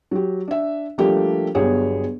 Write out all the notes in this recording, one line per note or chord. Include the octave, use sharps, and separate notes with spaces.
F#3 G4
D4 E5
F3 G3 A3 A#3 D4 G4
G1 F#3 B3 G4 G#4 C#5